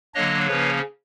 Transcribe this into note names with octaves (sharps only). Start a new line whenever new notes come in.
D3 F#3 A#3 D4 C#5 D#5
C#3 F3 A#3 C#4 B4 C#5